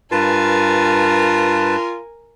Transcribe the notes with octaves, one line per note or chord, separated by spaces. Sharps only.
G2 F4 A#4 B4 G#5 A5